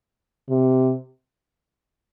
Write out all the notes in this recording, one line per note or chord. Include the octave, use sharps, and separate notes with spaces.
C3